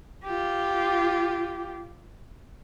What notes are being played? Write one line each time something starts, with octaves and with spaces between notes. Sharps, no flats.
F4 G4